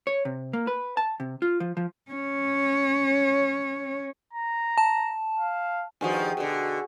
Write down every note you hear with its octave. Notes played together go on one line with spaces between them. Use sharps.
C#5
C3
A#3
B4
A5
C3
F4
F3
F3
C#4 C#5
A#5
A5
F5
G2 D#3 F3 F#4 G#4
B2 D3